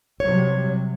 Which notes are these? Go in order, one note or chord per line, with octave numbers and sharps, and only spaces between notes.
C3 F#3 G3 C#5